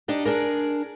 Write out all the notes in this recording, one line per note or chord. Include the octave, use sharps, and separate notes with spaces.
D4 D#4 G4
D4 G#4 A#4